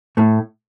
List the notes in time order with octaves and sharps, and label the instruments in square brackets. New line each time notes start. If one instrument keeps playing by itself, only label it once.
[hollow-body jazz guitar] A2 A3